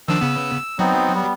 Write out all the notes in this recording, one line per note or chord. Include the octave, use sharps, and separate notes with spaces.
D#3 F3 D4 E6
C#3 B3
F#3 B3 C4 D#4
G3 B3